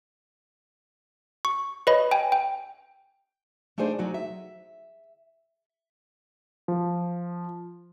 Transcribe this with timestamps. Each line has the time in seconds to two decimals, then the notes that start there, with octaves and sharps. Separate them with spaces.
1.45 C#6
1.87 B4 C#5 D#5 B5
2.11 G5 G#5
2.32 G5
3.78 A3 D4 D#4 G#4 C5 D5
3.99 F#3 D#4 F#4
4.14 E5
6.68 F3